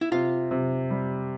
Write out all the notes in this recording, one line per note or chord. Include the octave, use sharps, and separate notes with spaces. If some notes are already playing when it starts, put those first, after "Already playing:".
E4
C3 F4
C3
G3